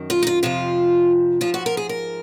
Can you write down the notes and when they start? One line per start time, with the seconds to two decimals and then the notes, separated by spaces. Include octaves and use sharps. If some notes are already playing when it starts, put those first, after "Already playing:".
Already playing: F#2 D#3
0.10 F4
0.23 D#4
0.27 F4
0.43 F2 C3 F3 F4
1.41 G#2 F3 F4
1.54 F#4
1.66 A#4
1.77 G#4
1.89 A#4